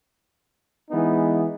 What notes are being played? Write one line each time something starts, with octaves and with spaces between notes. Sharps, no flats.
E3 G#3 B3 D#4